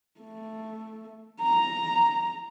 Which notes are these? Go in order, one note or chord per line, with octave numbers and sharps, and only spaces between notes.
A3
A#5